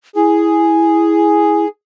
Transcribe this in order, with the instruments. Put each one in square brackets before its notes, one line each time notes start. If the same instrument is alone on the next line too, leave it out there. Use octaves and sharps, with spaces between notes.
[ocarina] E4 [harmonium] G#4